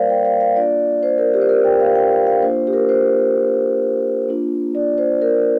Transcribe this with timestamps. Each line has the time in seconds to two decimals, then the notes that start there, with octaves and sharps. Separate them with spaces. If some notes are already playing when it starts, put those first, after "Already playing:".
Already playing: G3 A#3 F4 A#4 C5 D5 F5
0.10 G5
0.25 F5
0.40 F5
0.56 A#3 D4 F4 D5
1.03 C5
1.18 A#4
1.34 G4
1.41 C5
1.49 A#4
1.64 G5
1.80 F5
1.95 G5
2.11 F5
2.27 F5
2.42 A#3 D4 F4 C5
2.67 G4
2.73 A#4
2.89 C5
4.29 A#3 D4 F4
4.75 D5
4.98 C5
5.21 A#4